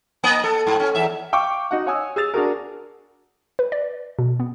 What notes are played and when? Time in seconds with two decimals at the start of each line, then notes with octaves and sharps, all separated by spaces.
0.24 A#3 D#5
0.44 A4
0.67 G#2
0.80 C#4
0.95 E2 E5
1.33 F5 G5 C#6 D6
1.71 D#4 F#4 F#5
1.86 C#5 F#5 G#5 D#6 E6
2.16 G#4 E6 A6 F7
2.34 D4 F#4 G#4 A#4
3.59 B4
3.72 D5
4.19 B2
4.40 B3